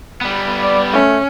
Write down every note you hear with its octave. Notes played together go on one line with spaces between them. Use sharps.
G3 B3
D5
A3 C#4